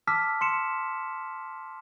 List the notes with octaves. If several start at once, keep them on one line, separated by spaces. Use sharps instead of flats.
A5 D6 E6 F6 B6
C6 C#7 E7